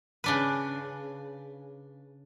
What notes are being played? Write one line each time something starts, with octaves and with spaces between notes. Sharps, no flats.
C#3 D4 B4